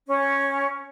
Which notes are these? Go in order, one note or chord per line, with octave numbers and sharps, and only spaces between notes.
C#4